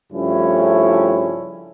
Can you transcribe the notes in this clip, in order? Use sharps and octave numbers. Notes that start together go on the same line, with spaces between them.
G2 C#3 F3 A3 C#4 E4